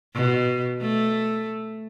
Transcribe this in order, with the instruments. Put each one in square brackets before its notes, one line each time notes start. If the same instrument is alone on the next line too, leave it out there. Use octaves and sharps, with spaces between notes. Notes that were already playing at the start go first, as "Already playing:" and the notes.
[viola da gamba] B2
A3